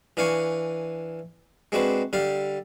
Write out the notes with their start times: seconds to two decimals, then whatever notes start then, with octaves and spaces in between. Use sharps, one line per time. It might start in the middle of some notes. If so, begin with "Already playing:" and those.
0.17 E3 D4 F5 G#5 C#6
1.72 G#3 C4 D4 F#4 B4
2.13 D3 G3 F5